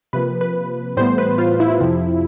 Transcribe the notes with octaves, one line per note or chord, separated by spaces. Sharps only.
C3 F3 A#3 B4
B4
A2 E3 G3 B3 C5
B4
F4
E4
F2 C3 F3